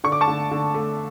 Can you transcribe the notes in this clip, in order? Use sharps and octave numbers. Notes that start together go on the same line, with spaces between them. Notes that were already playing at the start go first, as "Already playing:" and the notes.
D3 C#6
D6
A5 C#6
D3
D3
A3